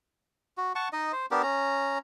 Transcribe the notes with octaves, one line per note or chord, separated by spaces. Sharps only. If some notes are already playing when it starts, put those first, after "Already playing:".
F#4
F#5 A5 C#6
D#4 D#5
C5
B3 D4 G4 A#4
C#4 A#5